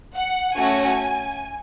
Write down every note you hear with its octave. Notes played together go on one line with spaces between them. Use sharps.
F#5
A3 C#4 F#4 G#5